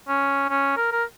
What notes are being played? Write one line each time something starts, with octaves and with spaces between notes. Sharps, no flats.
C#4
C#4
A#4
A#4